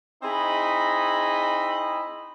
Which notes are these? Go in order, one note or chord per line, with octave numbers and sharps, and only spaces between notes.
C4 D#4 E4 G#4 D#5 B5